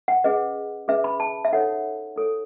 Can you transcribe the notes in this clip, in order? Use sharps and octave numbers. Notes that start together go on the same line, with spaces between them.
F#5
C#4 G#4 B4 D#5
C#4 G#4 B4 E5
B5
A5
E5
D#4 A4 C#5 F#5
D#4 A4 C#5